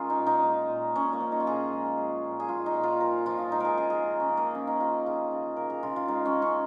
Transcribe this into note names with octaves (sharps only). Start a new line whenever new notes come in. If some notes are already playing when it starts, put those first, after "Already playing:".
Already playing: G#3 C#4 F4 G#4 A#4
D#4
A#2
D#4
G#3
A#2
A#2 C#4
A#3
F3
D#4
F4
A#2 G#4
G#3
G#3
A#2
G#4
G#3 F4
D#4
A#2
F4
F3 A#4
F3 F4
D#4
G#3 D#4
G#4 A#4
C#3 G#4
G#4
C#3
C#4
C#3
A#3
F3 C#4
D#4
C#3 F4
C#3 G#4
C#3
C#3 A#4
G#4
C#3 F4
F4
G#3 D#4
C#4
C#3
C#4